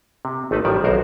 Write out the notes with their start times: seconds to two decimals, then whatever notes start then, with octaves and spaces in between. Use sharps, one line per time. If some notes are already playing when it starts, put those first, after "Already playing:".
0.25 C3
0.51 G#1 A3 D#4 B4 A5
0.65 A1 D#3 F3 G3 D5 E5
0.84 B1 F#4 A#4 C5